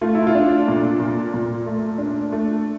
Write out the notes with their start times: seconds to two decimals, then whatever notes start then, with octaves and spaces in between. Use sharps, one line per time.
0.01 A3 F4
0.15 E4
0.27 F4
0.35 D4
0.68 A#2
1.00 A#2
1.34 A#2
1.66 A3
1.98 D4
2.32 A3